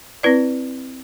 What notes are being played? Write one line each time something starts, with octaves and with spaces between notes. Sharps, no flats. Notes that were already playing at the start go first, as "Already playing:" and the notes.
C4 E4 B4 D5